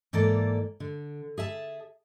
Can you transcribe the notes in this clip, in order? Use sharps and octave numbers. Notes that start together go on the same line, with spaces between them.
G#2 E3 A#3 A4 D5
D3
G#4 E5 A5